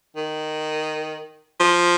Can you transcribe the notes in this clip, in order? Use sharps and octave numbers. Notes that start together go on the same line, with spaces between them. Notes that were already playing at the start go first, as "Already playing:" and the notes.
D#3
F3